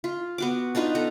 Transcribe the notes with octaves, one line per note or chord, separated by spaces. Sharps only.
F4
B3 F#4 D6
D4 D#4 F4 B4
B3 A4 A#5